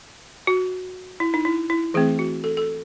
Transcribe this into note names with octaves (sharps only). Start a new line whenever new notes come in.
F#4
E4
D#4
E4
E4
E3 A3 C4 G#4
F#4
A4
A4